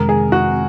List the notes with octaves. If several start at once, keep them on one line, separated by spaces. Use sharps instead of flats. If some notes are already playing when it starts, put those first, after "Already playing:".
Already playing: F2 C3 D#3 G#3 A#4
G#4
F#4